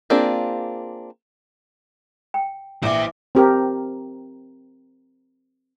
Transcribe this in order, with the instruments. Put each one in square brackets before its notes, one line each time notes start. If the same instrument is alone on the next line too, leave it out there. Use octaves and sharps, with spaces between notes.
[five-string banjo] A#3 C4 D4 F4 G#4
[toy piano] G5
[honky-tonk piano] A#1 D6 [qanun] E3 [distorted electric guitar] C5 E5
[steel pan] C4 G4 A#4